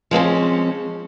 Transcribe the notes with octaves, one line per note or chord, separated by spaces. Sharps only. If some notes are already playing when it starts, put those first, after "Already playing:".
F3 G#3 C4 C#4